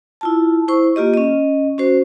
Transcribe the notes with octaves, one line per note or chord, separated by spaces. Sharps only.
E4 F4 A5
E4 C5 C#6
A#3 F4 G4 D#5
C#4 D#5
C#4 F#4 C5